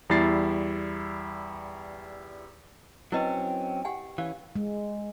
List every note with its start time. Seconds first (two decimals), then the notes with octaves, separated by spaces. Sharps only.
0.10 E2 G3 E4 A6 C7
3.12 F#3 C4 C#4 E4 B4 D#5 G5
3.85 G4 F#5 G#5
4.18 E3 C#4 F5
4.56 G#3